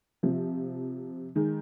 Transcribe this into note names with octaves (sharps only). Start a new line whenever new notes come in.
C3 F3
D#3 G#3